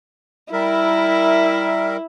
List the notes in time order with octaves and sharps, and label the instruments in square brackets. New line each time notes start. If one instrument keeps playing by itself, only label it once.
[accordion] G3 A#4 E5 [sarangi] E4